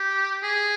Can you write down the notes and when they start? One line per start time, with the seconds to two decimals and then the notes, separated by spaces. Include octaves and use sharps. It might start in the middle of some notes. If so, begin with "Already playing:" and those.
Already playing: G4
0.43 G#4